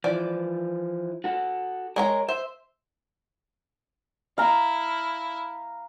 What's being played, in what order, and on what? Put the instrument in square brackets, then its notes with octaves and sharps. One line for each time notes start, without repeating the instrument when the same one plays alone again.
[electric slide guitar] E3 F3 [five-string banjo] D5
[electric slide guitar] F#4 A4
[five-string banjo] G#3 C#5 A#5 [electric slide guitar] A#4
[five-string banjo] C5 [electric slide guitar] E5
[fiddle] E4 [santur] F5 A#5